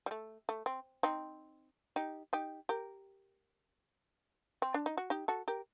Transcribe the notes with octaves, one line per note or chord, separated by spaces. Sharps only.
G3
A3
A3
C4
C4 D#4
D#4 G4
D#4 G4
G4 A#4
C4
D4
D#4
F#4
D#4 G4
F#4 A4
G4 A#4